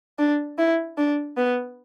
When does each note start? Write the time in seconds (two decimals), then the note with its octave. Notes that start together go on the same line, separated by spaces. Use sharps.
0.19 D4
0.58 E4
0.98 D4
1.37 B3